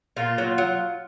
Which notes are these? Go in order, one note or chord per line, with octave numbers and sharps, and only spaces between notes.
A#2 F4
F#3
F#3